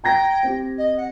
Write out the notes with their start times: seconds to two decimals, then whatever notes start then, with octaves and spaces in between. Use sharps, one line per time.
0.04 G5 A#5 G#6 A#6
0.43 C4 G4
0.78 D#5
0.97 F#5